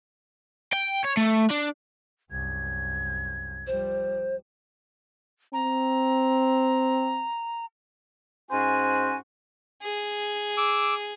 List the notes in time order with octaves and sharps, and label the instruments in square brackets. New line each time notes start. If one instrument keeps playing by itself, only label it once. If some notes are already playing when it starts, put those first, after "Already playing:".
[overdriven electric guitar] G5
C#5
A3
D4
[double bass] C2 F#2 [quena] G#6
[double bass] F3 G3 [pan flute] C5
[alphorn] C4 [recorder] A#5
[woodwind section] G#2 C#4 F#4 C5 G#5
[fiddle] G#4
[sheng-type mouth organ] D6 E6